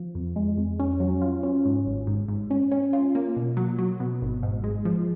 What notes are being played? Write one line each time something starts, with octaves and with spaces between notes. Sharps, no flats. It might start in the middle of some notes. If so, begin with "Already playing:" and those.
Already playing: F3
F2
G#3
F2
C#4
F#3
F4
C#4
G#2
G#1
G#2
G#2
C#4
C#4
F4
A#3
B2
F#3
F#3
B2
G#1
G#2
G#3
F3